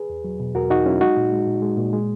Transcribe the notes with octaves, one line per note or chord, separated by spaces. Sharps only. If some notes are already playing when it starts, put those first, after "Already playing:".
Already playing: G#4 B4
E2
F#3
B2
E2 F#4 A#4
E2 D#4 F#4
F#3 C#4 E4
G#3 D#4 F#4
A#2
G#3
A#2
G#3
A#2
G#3